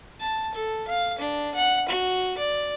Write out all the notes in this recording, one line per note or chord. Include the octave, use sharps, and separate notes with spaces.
A5
A4
F5
D4
F#5
F#4
D5